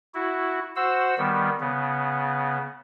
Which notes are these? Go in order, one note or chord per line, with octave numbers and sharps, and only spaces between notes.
E4 F#4
F#4 C5 F#5 E6
D#3 G3 B3
C#3 B3